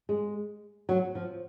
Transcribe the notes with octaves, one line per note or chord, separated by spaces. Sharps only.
G#3
F#3
F3